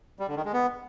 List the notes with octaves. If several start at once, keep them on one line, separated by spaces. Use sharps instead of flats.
G3
D3
D#3
G#3
B3